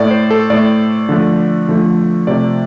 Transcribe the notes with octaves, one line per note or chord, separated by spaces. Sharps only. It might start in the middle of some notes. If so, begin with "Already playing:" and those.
Already playing: A2 A3 D5
C5
A4
A2 A3 D5
D3 F3 A3
D3 F3 A3
C3 F3 A3 D5